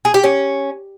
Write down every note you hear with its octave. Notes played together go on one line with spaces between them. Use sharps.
G#4
G4
C#4